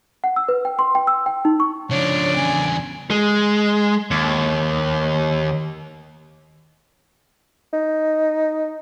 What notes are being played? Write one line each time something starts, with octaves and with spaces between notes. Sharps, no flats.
F#5
E6
B4
G5
C6
G5
E6
G5
D#4
C#6
C#3 F3 D4 C#5 D6
E2 C#3 G#5
G#3
D#2
D#4